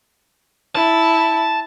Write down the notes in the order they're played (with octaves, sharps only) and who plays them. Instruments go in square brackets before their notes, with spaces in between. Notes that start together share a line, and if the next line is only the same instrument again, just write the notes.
[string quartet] E4 [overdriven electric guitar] A5